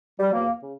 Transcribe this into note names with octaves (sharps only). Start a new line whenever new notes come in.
G3
E2 B2 F#3 A#3
C#3